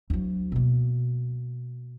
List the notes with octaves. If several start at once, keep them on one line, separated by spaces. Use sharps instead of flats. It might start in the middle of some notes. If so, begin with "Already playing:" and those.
D2 F#3
B2 A#3